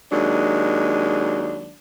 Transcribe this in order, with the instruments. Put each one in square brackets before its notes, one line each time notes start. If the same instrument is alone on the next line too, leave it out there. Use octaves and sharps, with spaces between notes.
[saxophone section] D#2 F#3 G#3 D4